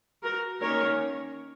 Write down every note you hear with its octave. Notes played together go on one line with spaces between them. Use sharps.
F#4 A#4
D#3 A#3 C#4 A#4 C#5